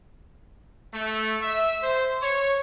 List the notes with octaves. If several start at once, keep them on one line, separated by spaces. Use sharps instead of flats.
A3
E5
C5
C#5